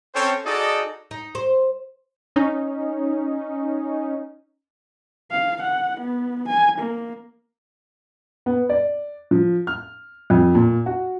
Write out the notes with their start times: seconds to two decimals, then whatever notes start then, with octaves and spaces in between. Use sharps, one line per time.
0.15 C4 C#4 A4 C5 C#5 G5
0.45 D#4 F#4 G#4 A4 D5 D#5
1.11 D#4
1.35 C5
2.36 C#4 D#4
5.31 F5
5.63 F#5
6.01 B3
6.48 G#5
6.79 A#3
8.46 B3
8.69 D5
9.31 F3
9.67 F6
10.30 F2
10.55 A#2
10.86 F#4